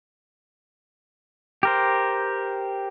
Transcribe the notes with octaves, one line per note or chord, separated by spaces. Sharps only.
G4 A#4 C5